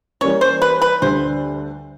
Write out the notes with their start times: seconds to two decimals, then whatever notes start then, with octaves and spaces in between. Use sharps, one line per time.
0.21 E3 G3 A#3 C#4 C#5
0.41 C5
0.62 B4
0.82 B4
1.02 D2 D3 G3 C5